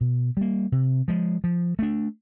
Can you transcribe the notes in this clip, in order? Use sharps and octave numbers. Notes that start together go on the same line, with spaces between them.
B2
G3 A#3
C3
F3 G#3
F3
A3 D4